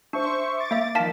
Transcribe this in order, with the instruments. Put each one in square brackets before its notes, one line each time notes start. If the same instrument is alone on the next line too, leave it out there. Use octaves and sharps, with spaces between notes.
[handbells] D4 [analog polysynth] C5 E5 C#6
[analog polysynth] D6 A6
[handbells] A#3 E5
[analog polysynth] D#3 F3 [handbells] F5 A5 B6